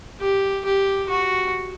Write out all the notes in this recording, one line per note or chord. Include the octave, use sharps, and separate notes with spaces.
G4
G4
F#4